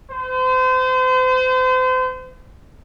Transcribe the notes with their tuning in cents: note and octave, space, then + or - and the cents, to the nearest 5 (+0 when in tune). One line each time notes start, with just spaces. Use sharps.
C5 -35